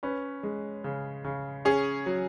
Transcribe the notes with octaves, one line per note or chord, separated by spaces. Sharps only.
C#4 B4
G#3
C#3
C#3
C#4 G#4
F#3